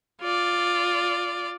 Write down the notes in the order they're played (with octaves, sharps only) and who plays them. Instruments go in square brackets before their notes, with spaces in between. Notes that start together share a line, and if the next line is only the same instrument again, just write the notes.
[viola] F4 D5